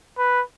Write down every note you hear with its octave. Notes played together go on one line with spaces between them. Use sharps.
B4